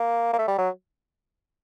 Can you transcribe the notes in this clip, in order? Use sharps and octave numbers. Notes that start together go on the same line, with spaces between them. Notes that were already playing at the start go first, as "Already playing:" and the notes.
Already playing: A#3
A#3
A3
G3
F#3